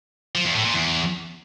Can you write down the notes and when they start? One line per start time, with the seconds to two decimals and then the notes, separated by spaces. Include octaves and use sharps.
0.35 F3
0.45 E2
0.55 A2
0.64 A#2
0.74 E2